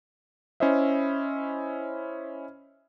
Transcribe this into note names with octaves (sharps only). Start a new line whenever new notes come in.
C#4 E4 C5 D#5 E5